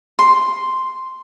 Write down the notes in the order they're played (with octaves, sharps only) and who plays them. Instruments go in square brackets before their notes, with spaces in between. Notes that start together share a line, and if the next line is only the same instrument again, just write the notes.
[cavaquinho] C6